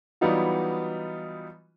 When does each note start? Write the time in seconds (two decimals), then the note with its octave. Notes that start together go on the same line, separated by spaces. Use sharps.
0.21 E3 F#3 G3 B3 D#4 F4